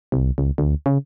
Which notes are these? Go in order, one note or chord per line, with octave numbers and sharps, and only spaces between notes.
C2
C#2
D2
C#3